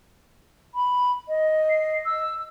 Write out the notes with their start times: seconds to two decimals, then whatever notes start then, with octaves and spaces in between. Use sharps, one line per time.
0.75 B5
1.28 D#5
1.70 C7
2.05 E6